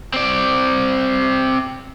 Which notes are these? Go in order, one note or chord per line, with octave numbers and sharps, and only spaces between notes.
C4 D5